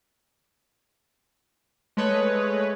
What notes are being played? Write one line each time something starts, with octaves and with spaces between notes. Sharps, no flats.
G#3 A3 B4 C#5 D#5